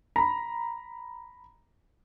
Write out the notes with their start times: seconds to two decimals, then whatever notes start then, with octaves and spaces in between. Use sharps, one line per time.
0.16 A#5 B5